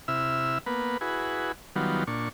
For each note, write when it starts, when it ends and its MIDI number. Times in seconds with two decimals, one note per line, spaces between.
0.08 0.58 48
0.08 0.58 64
0.08 0.58 76
0.08 0.58 88
0.08 0.58 89
0.66 0.97 58
0.66 0.97 59
0.66 0.97 71
1.01 1.52 64
1.01 1.52 66
1.01 1.52 68
1.01 1.52 71
1.76 2.04 51
1.76 2.04 54
1.76 2.04 55
1.76 2.04 59
1.76 2.04 65
2.07 2.29 46
2.07 2.29 62
2.07 2.29 85